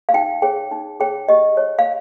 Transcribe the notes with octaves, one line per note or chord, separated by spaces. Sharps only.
F5
D#4 G5
G#4 C#5 G5
D#4
G#4 C#5 G5
G4 D#5
C#5
F5